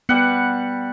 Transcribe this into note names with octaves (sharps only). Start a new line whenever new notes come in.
G3 B3 F#5